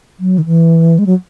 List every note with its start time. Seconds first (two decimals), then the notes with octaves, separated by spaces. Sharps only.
0.20 F#3
0.38 D#3
0.46 E3
0.99 G#3
1.06 F#3